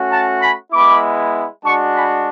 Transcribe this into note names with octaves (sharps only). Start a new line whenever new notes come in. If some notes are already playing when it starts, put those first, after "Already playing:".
Already playing: A3 C#4 F#4
F#5 A5
G#5 B5
G#3 B3 E4 B5 D6
G#3 D4 F#4 A5 C#6
G#5 B5